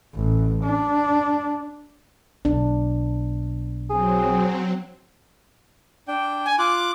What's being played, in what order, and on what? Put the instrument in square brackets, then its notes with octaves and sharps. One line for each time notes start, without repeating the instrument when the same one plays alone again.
[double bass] A1
D4
[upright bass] B1 [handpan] D4
[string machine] F#3 C4 [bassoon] G#4
[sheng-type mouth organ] D4 G5
[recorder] G#5
[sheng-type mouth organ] F4 F#6 [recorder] D6